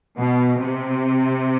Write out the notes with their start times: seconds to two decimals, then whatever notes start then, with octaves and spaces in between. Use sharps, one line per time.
0.19 B2
0.63 C3